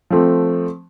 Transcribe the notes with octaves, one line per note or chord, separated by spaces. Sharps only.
F3 A3 C4